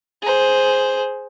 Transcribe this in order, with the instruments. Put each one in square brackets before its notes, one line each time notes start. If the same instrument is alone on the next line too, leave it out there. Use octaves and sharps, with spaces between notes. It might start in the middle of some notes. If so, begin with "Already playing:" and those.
[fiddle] G#4 C5